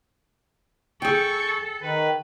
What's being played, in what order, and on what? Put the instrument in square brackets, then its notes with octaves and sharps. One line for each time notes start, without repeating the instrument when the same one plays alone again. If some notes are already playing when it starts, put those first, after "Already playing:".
[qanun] G#4 G5 [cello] A4 [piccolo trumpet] C#6
[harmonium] D#3 [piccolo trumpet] B4